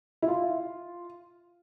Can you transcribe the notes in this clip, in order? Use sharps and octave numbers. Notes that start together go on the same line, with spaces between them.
E4
F4